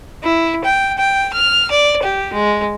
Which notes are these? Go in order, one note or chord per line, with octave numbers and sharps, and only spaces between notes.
E4
G5
G5
F6
D5
G4
G#3